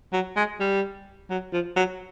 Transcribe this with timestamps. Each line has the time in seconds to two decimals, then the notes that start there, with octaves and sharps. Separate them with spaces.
0.13 F#3
0.36 G#3
0.60 G3
1.30 F#3
1.53 F3
1.76 F#3